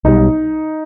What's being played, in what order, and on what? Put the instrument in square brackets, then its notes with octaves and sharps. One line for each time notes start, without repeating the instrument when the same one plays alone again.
[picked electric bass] B1 B2 G3 [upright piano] D#4